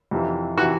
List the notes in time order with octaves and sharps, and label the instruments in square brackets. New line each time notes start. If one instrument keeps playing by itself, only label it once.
[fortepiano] F2 C3 E3
C3 E3 F#4